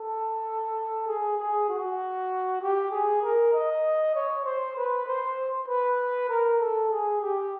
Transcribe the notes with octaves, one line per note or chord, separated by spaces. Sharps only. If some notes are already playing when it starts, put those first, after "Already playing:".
Already playing: A4
G#4
G#4
F#4
G4
G#4
A#4
D#5
C#5
C5
B4
C5
B4
A#4
A4
G#4
G4